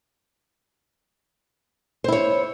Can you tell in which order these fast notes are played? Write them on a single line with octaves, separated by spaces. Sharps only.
C5 E4 C#5